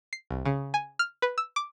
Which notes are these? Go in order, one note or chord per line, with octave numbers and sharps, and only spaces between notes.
C7
C2
C#3
G#5
F6
B4
E6
D6